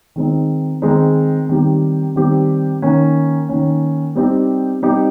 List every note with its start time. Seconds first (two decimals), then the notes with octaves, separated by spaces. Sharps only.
0.16 D#3 G#3 C4 D#4
0.82 D#3 G#3 C4 D#4
1.49 D#3 G3 C4 G4
2.16 D#3 G3 C4 G4
2.82 D#3 A#3 C#4
3.49 D#3 A#3 C#4
4.15 G3 C4 D#4 G4
4.82 G3 C4 D#4 G4